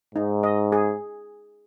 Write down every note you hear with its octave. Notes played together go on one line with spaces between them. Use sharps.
G#2 D#4
D#5
G#4